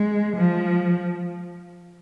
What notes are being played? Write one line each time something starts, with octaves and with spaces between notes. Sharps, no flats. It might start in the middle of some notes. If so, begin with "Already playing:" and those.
Already playing: G#3
F3